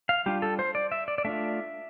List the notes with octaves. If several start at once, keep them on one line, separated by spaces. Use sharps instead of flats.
F5
G3 D4 F4 G4
A4
C5
D5
E5
D5
D5
A3 D4 F4 E5